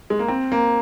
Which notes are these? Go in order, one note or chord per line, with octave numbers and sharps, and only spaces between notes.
G#3
A#3
C4
A#3